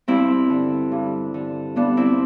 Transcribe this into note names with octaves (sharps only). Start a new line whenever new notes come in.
G2 C4 E4
D3
G2
D3
G2 B3 D4
C4 E4